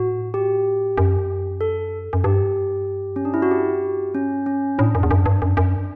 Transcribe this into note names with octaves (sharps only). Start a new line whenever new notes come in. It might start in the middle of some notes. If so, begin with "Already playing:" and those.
Already playing: A2 F#4
G4
F#2
A4
F#2
G2 G4
C#4
D4
E4
F#4
G4
C#4
C#4
A2 D4
F#2
E2
F#2
G2
F#2
F#2